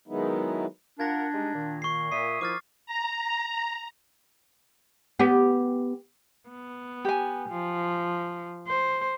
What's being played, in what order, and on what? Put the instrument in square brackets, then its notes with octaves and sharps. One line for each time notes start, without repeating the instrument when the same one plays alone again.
[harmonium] D#3 F#3 G#3 B3 D#4 E4
[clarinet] D4 [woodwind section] F4 A#4 F#5 [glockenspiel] G#6 A#6
[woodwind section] G3 G#3 D#4
A#2 D#3
[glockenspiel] C#6 C7
[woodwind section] A#2 E5 [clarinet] D#6 [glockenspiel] C7
[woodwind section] D#3 F3 E4 [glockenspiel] D6 F6 A6
[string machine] A#5
[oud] B3 G4
[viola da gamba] B3
[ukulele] G4 G#5
[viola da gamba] F3
C5